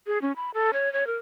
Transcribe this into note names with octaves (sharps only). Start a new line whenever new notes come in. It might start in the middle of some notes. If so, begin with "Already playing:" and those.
G#4
C#4
B5
A4
C#5
C#5
A#4